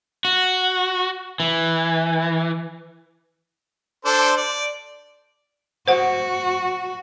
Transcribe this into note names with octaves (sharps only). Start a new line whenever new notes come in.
F#4
E3
D4 A4 C5
D5
F#4 C5 F#5